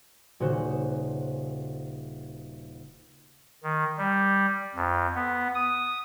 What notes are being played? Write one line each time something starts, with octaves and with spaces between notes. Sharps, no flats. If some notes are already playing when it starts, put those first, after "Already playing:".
D#1 C#3 F#4 C5 E7
D#3
G3
F2
B3
D#6